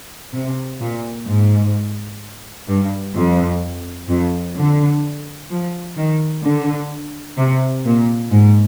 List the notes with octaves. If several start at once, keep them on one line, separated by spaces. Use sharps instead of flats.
C3
A#2
G#2
G2
F2
F2
D3
F3
D#3
D3
C3
A#2
G#2